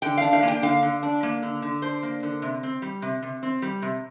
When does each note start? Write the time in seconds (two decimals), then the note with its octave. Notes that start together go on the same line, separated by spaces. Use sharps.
0.02 D3 G5
0.17 D4 F5
0.33 F5
0.43 A#3
0.48 G5
0.62 D3 F5
0.83 D3
1.03 D4
1.23 A#3
1.43 D3
1.62 D3
1.82 D4 C5
2.03 A#3
2.23 D3
2.42 C3
2.63 C4
2.82 G3
3.02 C3
3.22 C3
3.43 C4
3.62 G3
3.82 C3